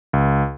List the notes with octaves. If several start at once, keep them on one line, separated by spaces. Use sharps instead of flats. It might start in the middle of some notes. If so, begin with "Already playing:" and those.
C#2